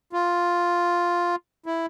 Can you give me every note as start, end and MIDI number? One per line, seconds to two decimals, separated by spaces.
0.13 1.36 65
1.66 1.86 64